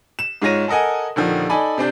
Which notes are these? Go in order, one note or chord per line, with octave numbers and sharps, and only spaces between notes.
E7
G#2 G#3 F4 C#5 A#6 D#7
A4 A#4 D#5 F#5 G#5
D#1 D3 D#3 F3
D#4 A4 D5 G#5 B5
C3 C4 D4 G6